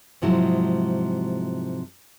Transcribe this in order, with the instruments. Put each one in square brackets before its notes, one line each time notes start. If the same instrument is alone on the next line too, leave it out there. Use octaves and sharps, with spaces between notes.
[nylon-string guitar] G#2 C3 F3 F#3 G#3 E4